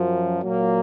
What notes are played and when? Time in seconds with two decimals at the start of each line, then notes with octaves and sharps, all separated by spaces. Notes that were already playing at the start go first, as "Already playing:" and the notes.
Already playing: F#2 F3
0.42 A#2 F#3 A#3